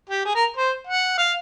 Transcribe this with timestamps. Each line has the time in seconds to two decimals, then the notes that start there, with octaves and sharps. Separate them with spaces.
0.09 G4
0.25 G#4
0.35 A#4
0.56 C5
0.87 F#5
1.18 F5